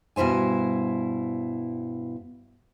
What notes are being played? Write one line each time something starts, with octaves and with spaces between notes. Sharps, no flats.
G2 B2 E4 C5 G#5